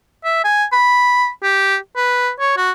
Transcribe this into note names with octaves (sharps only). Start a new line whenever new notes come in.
E5
G#5
B5
G4
B4
C#5
F#4